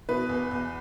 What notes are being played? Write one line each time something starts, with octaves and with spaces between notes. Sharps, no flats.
B2 B4
E2
E2